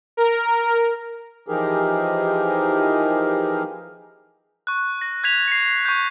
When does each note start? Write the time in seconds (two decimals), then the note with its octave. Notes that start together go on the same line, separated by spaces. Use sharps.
0.17 A#4
1.48 E3 F3 D#4 G4 G#4 A#4
4.67 C#6 F#6
5.01 A#6
5.24 F#6 G#6 B6 F7
5.48 C7 C#7
5.85 C#6 G6